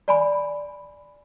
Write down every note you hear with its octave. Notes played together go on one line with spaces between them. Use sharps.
D5 G#5 B5